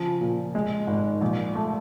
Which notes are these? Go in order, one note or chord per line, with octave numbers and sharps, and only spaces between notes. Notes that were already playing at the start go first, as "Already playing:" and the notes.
Already playing: C#3 F3
A#2
G#3
G#1
A#1
A3